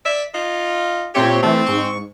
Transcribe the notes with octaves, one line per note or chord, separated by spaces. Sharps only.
D5 E5
D#4 F4
A#2 A3 C4 G4 C#5
E3 A3 C4
G#2 C#6